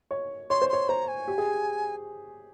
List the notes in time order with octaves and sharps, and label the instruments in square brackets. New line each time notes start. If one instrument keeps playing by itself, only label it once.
[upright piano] C#5
[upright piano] C#5 [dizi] C6
[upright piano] C5
[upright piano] C#5 [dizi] C6
[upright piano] C5 [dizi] A#5
[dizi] G#5
[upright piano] G4
G#4